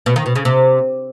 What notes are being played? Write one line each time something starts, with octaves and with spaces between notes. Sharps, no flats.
B2
D#3
B2
C#3
C3